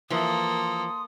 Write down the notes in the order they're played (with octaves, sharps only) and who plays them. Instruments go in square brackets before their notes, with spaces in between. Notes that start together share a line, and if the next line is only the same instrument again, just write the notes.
[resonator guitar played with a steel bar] E3 F3 [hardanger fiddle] A#3 A4 [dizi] C6 [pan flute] D#6